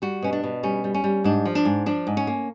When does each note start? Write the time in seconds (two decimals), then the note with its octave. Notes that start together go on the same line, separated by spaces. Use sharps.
0.02 G3 F#4
0.22 B2 C#4
0.33 D4
0.43 B2
0.63 G3 C#4
0.84 G3
0.94 C#4
1.04 G3
1.24 G#2 D4
1.45 F3
1.55 D4
1.65 G#2
1.86 F3 D4
2.07 G#2
2.17 C#4
2.27 A#3